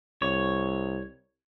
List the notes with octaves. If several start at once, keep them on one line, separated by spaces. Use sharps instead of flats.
C2 C#5